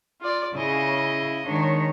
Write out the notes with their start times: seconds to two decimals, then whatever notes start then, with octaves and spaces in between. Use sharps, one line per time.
0.21 F4 D5
0.54 C#3 E4 D#5
1.45 D#3 G#3 D4 C#5